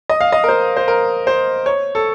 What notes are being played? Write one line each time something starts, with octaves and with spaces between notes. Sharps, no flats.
D#5
F5
D#5
A#4
C5
C5
A#4
C5
C#5
A4